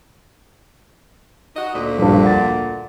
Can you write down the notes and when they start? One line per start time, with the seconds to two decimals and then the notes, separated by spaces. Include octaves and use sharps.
1.56 D#4 F#4 D#5
1.73 D2 A#2
1.99 A#1 G2
2.23 F#5 A6